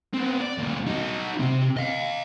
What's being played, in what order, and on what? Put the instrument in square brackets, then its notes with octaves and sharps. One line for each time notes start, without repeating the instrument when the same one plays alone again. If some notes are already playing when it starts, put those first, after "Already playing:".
[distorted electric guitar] B3 C4
D5
D2 A#2
D#4 F#4
C3 C4
D#5 F5